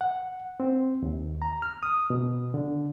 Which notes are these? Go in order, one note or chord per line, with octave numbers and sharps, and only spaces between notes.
F#5
C4
D#2
A#5
F6
D#6
B2
D3